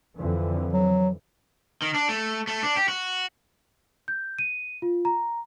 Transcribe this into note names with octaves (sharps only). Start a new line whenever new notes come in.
F2 D3 E3
F#3
D#3
D4
A3
A3
D4
G4
F#4
G6
D#7
F4
A#5